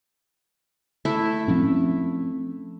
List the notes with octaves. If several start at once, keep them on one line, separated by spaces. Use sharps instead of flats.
A3 E4 E5
F3 C4 C#4